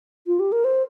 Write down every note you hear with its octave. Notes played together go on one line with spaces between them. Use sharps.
F4
G4
A#4
C5